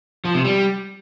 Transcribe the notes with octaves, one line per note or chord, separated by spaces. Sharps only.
F3
C3
G3